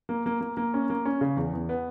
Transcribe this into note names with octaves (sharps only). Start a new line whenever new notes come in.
A#3
A#3
A#3
A#3
C#4
A#3
C#4
C#3
E2
E2
B3